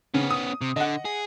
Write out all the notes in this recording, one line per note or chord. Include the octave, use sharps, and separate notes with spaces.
C#3 B3 C#4
D#6
C3
D3 D#5 F#5
G#4